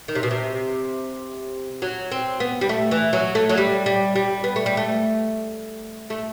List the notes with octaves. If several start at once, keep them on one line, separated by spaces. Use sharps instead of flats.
D#3
C3
B2
C3
F#3
C4
B3
G3
A3
E3
F#3
A3
F#3
G3
G3
G3
B3
A3
G3
A3
A3